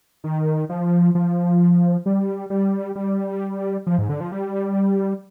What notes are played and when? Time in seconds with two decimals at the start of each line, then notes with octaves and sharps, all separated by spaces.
0.24 D#3
0.69 F3
1.15 F3
2.06 G3
2.50 G3
2.95 G3
3.87 F3
3.98 G#2
4.09 D3
4.20 F3
4.32 G3